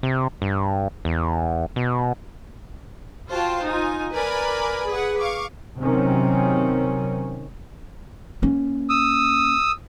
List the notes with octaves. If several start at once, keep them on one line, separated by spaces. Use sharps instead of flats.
C3
G2
E2
B2
F4 F#4 C5 F5 G5 A5
D#4 F4 G#5
A#4 B4 D5 G#5 B5
G#4 B4 F#5
F5 C#6 D6
C3 D#3 F#3 C4 C#4
A#3 C#4
D#6 E6